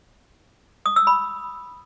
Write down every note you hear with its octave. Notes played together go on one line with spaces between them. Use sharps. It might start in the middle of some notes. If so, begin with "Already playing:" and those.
D#6
E6
B5